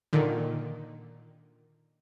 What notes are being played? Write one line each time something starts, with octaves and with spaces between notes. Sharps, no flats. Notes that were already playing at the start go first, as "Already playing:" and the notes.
A#2 D3 D#3